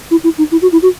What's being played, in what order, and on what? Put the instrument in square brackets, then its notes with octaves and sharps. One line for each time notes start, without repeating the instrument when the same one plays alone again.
[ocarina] E4
E4
D#4
E4
F#4
E4
F#4